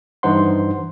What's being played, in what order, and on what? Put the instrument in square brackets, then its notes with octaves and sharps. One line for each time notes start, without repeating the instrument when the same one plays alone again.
[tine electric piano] G2 E3 D#4 C5 F#5 C6